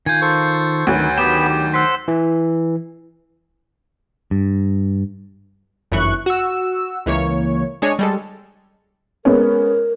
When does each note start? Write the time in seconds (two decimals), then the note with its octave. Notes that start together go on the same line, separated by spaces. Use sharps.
0.06 D#3 F4 G#5 G6 G#6
0.21 A4 C5 C#6
0.87 D2 D#3 F#3 B4
1.18 D#3 B3 G4 G5 B5 E7
1.49 G4
1.74 C5 F#5 C6 E6 B6
2.08 E3
4.31 G2
5.91 G1 F#2 E3 C#6 F#6
6.26 F#4 E6
7.06 C#2 E3 A#3 C#5
7.82 G#3 D4 G#4 C#5
7.99 G3 G#3 A4
9.25 G#3 B3 C#4 A#4